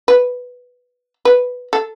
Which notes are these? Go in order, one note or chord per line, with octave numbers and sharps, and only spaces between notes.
B4
B4
A4